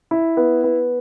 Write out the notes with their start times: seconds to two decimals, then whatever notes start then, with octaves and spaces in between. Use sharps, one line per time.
0.11 E4
0.37 B3
0.64 B3